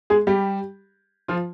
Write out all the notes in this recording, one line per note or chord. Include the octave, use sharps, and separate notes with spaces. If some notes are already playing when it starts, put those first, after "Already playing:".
G#3 G#4
G3 G4
F3 F4